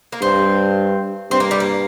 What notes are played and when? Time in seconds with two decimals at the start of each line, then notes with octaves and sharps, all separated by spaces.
0.12 A#3
0.21 G2 C4
1.31 G2 C4
1.40 A#3
1.51 G3
1.60 A#3